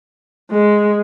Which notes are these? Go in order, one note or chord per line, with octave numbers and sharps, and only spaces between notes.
G#3